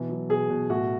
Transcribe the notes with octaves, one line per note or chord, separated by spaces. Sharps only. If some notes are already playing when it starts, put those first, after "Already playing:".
Already playing: B2 E3
F#3
B2 G#4
B2
A2 F#4